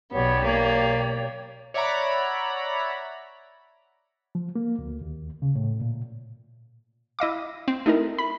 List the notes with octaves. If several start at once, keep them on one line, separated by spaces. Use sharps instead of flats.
B1 B3 G4 C#5 D5
A#3
C#5 D5 E5 F#5 A#5 B5
F3
A#3
D2
D#2
C#3
A2
A#2
E4 D#5 F5 D6
C4
A3 D#4 E4 A#4
B5